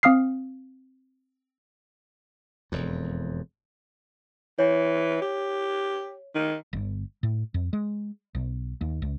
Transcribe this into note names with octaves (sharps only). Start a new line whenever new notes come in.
C4 F5 D#6 F6 C7
E1 F2
E3 C#5
G4
D#3
G1
A2
F2
G#3
B1
D#2
C#2